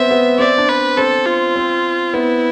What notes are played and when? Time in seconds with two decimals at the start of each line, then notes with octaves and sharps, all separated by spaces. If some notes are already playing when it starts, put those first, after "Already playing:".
Already playing: B3 C4 E5
0.11 B3
0.39 C4 D5
0.58 D4
0.68 B4
0.98 C4 A4
1.26 F4
1.56 C4
2.14 B3 E4